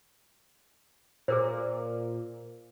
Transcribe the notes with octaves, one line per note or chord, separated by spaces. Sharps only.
A#2 G#4 A#4 C5